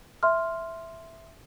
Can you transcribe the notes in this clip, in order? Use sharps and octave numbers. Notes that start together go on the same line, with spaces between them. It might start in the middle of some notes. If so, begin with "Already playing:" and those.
E5 C6 F6